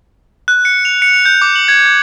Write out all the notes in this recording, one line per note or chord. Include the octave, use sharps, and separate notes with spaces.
F#6
C#7
F7
C#7
F7
G6
D6
F#7
G#6
G6